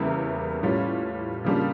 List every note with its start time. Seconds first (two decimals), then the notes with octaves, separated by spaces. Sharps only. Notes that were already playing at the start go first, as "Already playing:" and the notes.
Already playing: E2 C#3 G3 A#3 E4
0.63 A2 G3 C#4 F4
1.45 C#3 G3 A#3 D4 F4